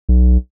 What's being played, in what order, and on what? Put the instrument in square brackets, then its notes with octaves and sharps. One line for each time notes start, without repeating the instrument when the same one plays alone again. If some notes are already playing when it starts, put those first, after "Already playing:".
[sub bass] B1